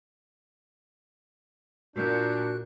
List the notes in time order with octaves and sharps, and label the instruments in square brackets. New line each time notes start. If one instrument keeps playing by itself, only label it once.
[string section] A#2 [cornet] D4 [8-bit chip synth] F#4 A#4 F#6 [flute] G6